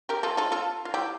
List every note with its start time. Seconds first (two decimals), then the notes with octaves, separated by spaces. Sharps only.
0.09 G4 A#4
0.23 F4 A4
0.37 F4 A4
0.52 F4 A4
0.85 F4
0.94 E4 G4